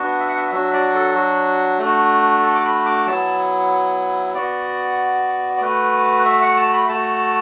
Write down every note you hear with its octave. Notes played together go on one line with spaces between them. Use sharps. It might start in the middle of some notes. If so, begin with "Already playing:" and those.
Already playing: B3 D4 F#4
E5
F#5
E5
F#3 D4 F#4 E5
D5
A4
F#4
A3 D4 F#4
A4
D6
B5
D6
F#3 B3 E4 A5
B3 F#4 D5
D5
A3 F#4 B4
E5
F#5
A5
B5
A3 F#4 A5